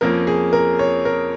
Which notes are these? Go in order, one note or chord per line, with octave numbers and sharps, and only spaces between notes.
F2 F3 A#3 C#4 A#4
G#4
A#4
C#5
A#4